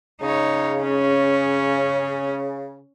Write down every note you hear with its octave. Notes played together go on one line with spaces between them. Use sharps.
C#3 D#4 C#5
C#4